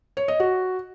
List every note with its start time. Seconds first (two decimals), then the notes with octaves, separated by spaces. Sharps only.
0.17 C#5
0.28 D#5
0.40 F#4